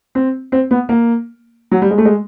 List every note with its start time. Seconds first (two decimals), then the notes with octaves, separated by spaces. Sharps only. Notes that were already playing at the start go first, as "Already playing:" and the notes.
0.15 C4
0.52 C4
0.71 B3
0.89 A#3
1.71 F#3
1.82 G3
1.91 G#3
1.98 A3
2.05 G#3